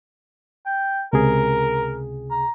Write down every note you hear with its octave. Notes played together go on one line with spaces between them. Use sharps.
G5
C#2 C3 G#4 A#4
A#5